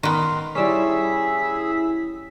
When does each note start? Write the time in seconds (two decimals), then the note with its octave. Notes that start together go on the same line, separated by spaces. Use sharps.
0.03 D#3 B3 A#4 A#5 C6
0.55 G3 C#4 E4 G#4 E6 B6